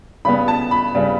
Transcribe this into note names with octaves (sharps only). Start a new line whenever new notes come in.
C#3 G3 B3 B5
A5
B5
C#3 G3 B3